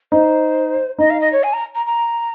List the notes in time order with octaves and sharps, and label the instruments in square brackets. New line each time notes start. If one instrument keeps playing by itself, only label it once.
[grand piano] D#4 [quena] C5
[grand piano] D#4 [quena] D#5
[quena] F5
D#5
C#5
G#5
A#5
A#5
A#5